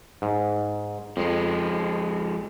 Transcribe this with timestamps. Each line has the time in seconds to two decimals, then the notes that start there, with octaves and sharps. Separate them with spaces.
0.22 G#2
1.17 F2 F3 G#3